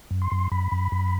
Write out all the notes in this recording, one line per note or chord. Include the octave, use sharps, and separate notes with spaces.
F#2
C6
F#2
F#2 B5
F#2
F#2